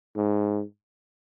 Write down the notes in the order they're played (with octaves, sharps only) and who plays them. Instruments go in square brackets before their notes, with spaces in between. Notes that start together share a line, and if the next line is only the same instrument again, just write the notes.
[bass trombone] G#2